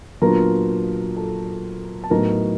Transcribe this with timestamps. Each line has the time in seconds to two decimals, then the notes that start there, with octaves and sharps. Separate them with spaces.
0.22 A#2 F#3 B3 D4 F4 A#4 A#5
1.16 A4 A5
2.04 A5
2.10 A2 F#3 B3 D#4 A#4 A#5